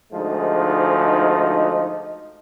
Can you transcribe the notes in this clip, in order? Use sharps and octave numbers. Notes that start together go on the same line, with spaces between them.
D2 G#2 F3 G#3 D#4